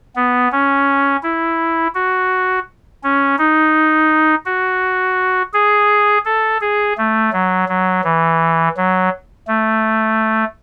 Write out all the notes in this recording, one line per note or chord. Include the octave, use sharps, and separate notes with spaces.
B3
C#4
E4
F#4
C#4
D#4
F#4
G#4
A4
G#4
A3
F#3
F#3
E3
F#3
A3